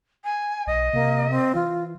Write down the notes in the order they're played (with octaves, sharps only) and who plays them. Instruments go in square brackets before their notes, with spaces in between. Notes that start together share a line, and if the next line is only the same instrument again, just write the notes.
[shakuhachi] G#5
[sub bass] B1 [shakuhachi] D#5
[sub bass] C3 [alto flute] A#3
[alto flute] C4
[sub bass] E3 [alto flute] F4